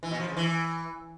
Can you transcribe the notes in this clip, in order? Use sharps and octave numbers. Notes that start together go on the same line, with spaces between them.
E3
B2
F3
C#3
E3